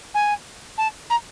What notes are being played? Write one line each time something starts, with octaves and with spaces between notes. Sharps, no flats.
G#5
A5
A#5